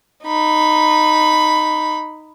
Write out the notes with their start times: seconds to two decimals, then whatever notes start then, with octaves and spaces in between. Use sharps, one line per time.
0.24 D#4 B5